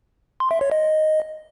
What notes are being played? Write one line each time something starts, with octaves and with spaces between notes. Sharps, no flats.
C6
E5
C#5
D#5